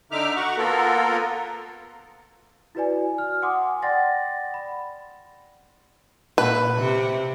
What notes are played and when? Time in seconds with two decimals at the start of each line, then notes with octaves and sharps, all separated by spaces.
0.11 D3 D#4 E5 D6 F6
0.36 F#4 F#5 C#6
0.58 A#3 B3 F4 A4 A#4
2.75 E4 F#4 B4 D5 G#5
3.18 F6
3.42 F#5 G#5 C6 D6 D#6
3.82 D5 F#5 G5 C6 A6 A#6
4.54 B5
6.38 A#2 B4
6.77 C3